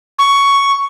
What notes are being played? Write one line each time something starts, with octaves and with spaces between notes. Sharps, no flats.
C#6